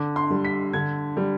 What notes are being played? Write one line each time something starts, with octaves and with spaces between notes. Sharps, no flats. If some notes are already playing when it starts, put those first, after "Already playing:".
Already playing: D3 D6
C6
G3
B6
D3 G#6
G3